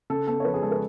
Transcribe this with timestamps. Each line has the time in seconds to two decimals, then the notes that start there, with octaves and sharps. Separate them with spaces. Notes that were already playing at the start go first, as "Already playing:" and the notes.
0.10 C#3 A4
0.27 B3 A4
0.40 C#5
0.44 F3 B4
0.54 G#4
0.62 G#3 A4
0.71 B4